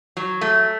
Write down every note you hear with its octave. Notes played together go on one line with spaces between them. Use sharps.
F#3
A3